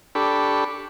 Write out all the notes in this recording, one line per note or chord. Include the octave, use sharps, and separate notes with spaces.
D4 G4 A4 B5 C#6